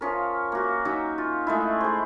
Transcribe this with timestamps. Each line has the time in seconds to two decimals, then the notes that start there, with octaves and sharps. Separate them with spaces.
0.01 F3 C#4 A#4
0.52 A#3 F#4
0.85 F#3 C#4 D#4
1.18 F4
1.47 G#3 A3 E4
1.81 G#4 C5